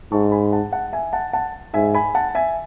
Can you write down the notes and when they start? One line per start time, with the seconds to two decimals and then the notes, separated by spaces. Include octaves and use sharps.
0.12 G#2 A5 C#6
0.32 G#5 B5
0.52 F#5 A5
0.73 F#5 A5
0.93 E5 G#5
1.13 F#5 A5
1.33 F#5 A5
1.74 G#2 E5 G#5
1.94 G#5 B5
2.15 F#5 A5
2.35 E5 G#5